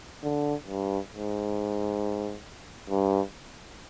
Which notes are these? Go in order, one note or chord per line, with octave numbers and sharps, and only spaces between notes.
D3
G2
G#2
G2